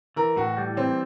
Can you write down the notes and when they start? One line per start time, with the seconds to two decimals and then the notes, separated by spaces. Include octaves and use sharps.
0.16 E3 A#4
0.36 A2 F#4
0.57 G3
0.77 E3 C4